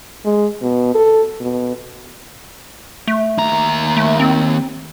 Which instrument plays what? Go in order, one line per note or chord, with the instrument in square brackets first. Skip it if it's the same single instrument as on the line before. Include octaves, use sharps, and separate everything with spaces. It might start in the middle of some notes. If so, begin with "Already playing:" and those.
[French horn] G#3
B2
A4
B2
[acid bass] A3
[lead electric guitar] D#2 A#5
[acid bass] A3
C4